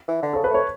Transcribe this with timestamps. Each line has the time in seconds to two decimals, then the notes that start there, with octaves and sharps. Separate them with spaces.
0.08 E3
0.23 D3
0.33 C#3 A4
0.44 B4
0.50 A3 C#5